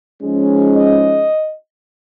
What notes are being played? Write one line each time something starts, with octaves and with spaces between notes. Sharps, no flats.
G#2 F3 G#3 C#4
D#5